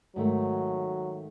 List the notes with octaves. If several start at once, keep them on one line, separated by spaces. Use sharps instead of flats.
G#2 D#3 F#3 A3